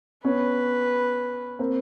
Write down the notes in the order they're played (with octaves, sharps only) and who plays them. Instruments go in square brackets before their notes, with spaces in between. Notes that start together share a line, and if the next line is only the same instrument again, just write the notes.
[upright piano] B3 C#4 [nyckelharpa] B4
[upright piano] A#3 C4